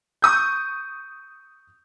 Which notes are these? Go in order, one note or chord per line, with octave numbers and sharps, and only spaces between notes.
C#6 D#6 G6